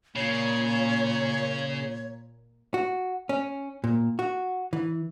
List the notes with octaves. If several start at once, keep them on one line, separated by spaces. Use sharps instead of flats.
A#2 C#3 C#5
F#4
C#4
A#2
F#4
E3